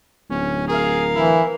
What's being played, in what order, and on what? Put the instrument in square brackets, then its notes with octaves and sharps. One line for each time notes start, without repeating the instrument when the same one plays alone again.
[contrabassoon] D1 [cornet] C#4
[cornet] G#4 [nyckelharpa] A#4 F5
[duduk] E3 [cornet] E4